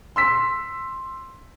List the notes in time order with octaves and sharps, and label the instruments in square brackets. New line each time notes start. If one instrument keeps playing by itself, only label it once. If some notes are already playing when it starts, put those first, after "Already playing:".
[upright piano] C6 E6 B6